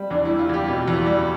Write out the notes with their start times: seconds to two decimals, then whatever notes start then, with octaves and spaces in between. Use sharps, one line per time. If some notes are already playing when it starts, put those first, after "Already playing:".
Already playing: G3
0.10 E2 D4
0.25 G3 E4
0.39 F4
0.49 E2 G4
0.68 B2
0.88 E2
1.06 G3